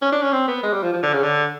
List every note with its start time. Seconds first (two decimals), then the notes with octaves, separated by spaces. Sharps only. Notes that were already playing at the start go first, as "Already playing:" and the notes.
0.02 C#4
0.12 D4
0.22 C#4
0.32 C4
0.47 B3
0.63 G#3
0.73 G3
0.83 F3
0.93 F3
1.03 D3
1.13 C#3
1.23 D3